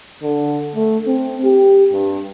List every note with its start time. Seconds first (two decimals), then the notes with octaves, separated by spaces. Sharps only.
0.23 D3
0.76 A3
1.07 C4
1.44 G4
1.93 G2